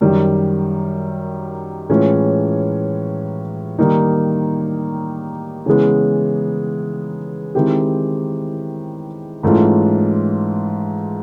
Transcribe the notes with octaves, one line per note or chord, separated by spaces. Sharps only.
F#2 D#3 G3
A2 E3 G#3 C#4 F4
D#3 G3 A#3 D#4
C#3 E3 G#3 B3
D#3 G#3 C4 E4 G4
G#2 E3 A3 C#4 F4